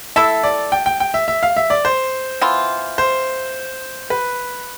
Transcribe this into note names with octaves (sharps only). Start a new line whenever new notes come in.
A3 E4 A4 E5
D5
G5
G5
G5
E5
E5
F5
E5
D5
C5
E3 B3 F4
C5
B4